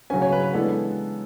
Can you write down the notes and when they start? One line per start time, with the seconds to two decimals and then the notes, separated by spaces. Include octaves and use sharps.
0.10 C#3 F#3 C#4 G#5
0.22 C#5
0.32 B4
0.43 B4
0.53 E3 G#3 B3 D4 A4